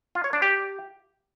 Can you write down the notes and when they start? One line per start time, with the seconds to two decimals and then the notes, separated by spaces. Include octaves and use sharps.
0.15 F4
0.24 C#5
0.33 D4
0.42 G4